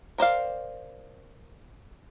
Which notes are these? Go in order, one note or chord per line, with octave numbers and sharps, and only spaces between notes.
A#4 C5 D5 F5